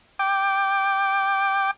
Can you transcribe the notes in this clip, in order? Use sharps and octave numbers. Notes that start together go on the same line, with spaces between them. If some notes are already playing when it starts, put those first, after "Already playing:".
G5 D6